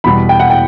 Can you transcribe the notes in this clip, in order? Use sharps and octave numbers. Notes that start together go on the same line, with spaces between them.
E2 B2 G3 B5
G5
F#5
G5